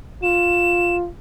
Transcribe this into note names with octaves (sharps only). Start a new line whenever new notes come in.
F4 E7